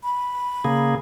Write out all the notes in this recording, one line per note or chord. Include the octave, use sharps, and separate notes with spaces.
B5
C#3 A#3 G#4